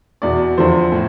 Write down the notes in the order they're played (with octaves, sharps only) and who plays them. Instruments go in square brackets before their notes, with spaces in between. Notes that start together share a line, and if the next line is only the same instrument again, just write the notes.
[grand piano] E2 B2 D5
E2 D3 F3 C5
A2